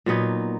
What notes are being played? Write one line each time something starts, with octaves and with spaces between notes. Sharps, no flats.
A#2 F#3 B3 D#4